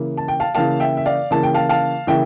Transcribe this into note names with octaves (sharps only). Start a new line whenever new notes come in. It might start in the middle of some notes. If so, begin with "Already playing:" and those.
Already playing: C#3 E3 A#3
A5
G5
F5 A5
C#3 E3 A#3 F5 A5
E5 G5
E5
D5 F5
C#3 E3 A#3 A5
G5
F5 A5
F5 A5
C#3 E3 A#3 E5 G5